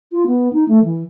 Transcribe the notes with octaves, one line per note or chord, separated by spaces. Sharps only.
F4
B3
D#4
A3
E3